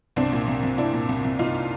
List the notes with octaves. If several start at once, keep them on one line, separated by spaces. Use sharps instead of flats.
C2 C4 D4
A#2
C2
C2
C2 D4 E4
A#2
C2
C2
C2 D#4 F4